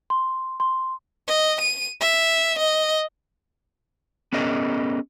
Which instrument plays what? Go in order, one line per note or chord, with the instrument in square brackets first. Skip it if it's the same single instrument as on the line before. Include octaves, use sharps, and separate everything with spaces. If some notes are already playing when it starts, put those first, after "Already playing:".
[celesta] C6
C6
[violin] D#5
D#7
E5
D#5
[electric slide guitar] B3 C#4 G#4 A#4 D#5